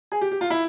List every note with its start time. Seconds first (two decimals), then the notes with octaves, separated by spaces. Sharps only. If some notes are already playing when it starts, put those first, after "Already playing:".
0.12 G#4
0.21 G4
0.31 G4
0.41 F4
0.50 E4